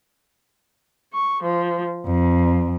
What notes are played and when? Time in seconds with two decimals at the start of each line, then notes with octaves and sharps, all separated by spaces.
1.13 C#6
1.43 F3
2.06 F2